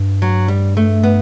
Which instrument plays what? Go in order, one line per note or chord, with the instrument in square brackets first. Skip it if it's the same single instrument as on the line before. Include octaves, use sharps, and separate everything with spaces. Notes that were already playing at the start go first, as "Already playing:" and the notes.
Already playing: [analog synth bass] G2
[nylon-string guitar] F#3
G3
A3
B3